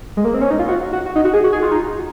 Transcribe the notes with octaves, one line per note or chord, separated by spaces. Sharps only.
G#3
A#3
C4
C#4
D#4
F4
F#4
F#4
F#4
D#4
F#4
G#4
F#4
G#4
F4
D#4